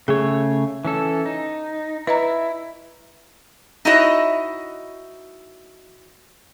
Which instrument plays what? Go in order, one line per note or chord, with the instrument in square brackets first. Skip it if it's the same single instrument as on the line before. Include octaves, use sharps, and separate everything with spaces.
[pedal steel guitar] C#3 A3 C#5 [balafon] G#4
[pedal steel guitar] E3 C#4 A4
D#4
[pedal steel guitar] E4 [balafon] B4 D#5 A#5
[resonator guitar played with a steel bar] D#4 E4 F#4 C#5 D#5 E5